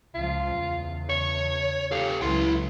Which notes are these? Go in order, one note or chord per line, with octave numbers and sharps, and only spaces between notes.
C#2 F3 F4
E2 C#3
C#5 C#6
G4 A4 F5
C#2 F#3 B3 E4 C6